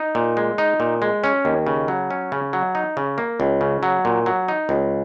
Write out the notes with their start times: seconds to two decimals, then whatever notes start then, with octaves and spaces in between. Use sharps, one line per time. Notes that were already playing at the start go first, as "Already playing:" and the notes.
Already playing: D#4
0.15 A#2
0.37 G#3
0.58 D#4
0.80 A#2
1.02 G#3
1.24 C#4
1.45 D#2
1.67 C#3
1.88 F#3
2.11 C#4
2.32 C#3
2.53 F#3
2.75 D#4
2.97 C#3
3.18 A#3
3.40 C#2
3.61 C#3
3.83 F#3
4.05 A#2
4.26 F#3
4.49 D#4
4.69 C#2